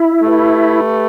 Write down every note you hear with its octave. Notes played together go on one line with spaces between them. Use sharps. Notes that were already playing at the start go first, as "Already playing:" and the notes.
Already playing: E4
A3 G4 B4